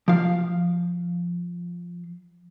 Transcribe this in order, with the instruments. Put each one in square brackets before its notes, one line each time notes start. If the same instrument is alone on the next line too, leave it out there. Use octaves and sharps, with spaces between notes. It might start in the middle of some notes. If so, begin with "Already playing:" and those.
[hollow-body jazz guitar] F3 F5